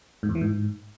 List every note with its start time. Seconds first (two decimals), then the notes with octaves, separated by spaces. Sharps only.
0.23 G#2
0.29 E2
0.35 E3
0.41 G#2